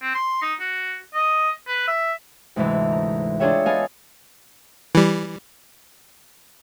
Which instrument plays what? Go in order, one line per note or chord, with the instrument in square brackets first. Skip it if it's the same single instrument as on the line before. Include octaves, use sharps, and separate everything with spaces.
[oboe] C4
C6
D#4
F#4
D#5
B4
E5
[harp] D2 G#2 C3 E3
A#5
D4 F4 G#4 C#5 E5 G5
B3 A4 D#5 F5 G#5
[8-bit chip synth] E3 G3